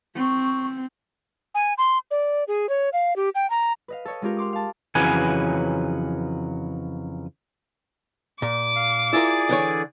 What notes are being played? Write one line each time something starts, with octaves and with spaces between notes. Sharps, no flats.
C4 C#6
G#5
C6
D5
G#4
C#5
F5
G4
G5
A#5
B4 D#5 F5
A4 C#5 D#5
G#3 C#4 F4 G4 A#4
F5 C6 D6 D#6
F5 A5
F2 C#3 E3 F#3 B4 G#5
A#2 D6
F5
E4 F4 G#4 A#4 D5
D3 E3 C#5